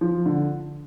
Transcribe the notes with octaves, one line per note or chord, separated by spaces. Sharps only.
F3
D3